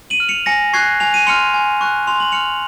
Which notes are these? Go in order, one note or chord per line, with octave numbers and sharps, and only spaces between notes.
D#7 F#7
F6
C#7 F7
G#5 A#6 C#7
C#6 F#6 G#6 C7
G#5 F7
D#7
C6 F6 C#7 F7
G#5
C#6 F#6
C6 F7
F#7
F6 C#7 F7